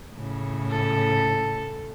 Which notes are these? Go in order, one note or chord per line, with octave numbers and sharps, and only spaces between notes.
A2 C#3
A4